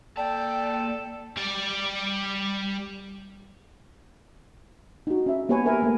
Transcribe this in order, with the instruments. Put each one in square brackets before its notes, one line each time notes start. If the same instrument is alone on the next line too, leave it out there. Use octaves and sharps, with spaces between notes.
[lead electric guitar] A#3 A5 [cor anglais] A4 [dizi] D5 [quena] G5
[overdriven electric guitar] G3 D5
[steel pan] D#4 F#4
C#4 E5
A#3 B3 G4 B4 C#5 G#5
G4 A#4 B4 E5 G#5
A3 A#3